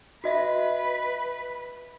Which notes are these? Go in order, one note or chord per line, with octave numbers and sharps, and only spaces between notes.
F#4 B4 D#5 E5